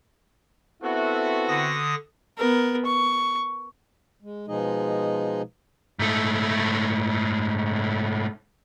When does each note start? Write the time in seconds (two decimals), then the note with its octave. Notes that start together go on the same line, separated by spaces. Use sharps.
0.83 B3 C4 E4 F#4 A4 E5
1.48 D3 D#6 A#6
2.38 B3 A#4
2.86 C#6
4.22 G#3
4.48 B2 F3 G#3 D#4 G#4 D#5
5.99 G#2 A3